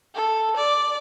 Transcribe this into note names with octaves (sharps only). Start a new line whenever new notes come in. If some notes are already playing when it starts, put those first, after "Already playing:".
A4
D5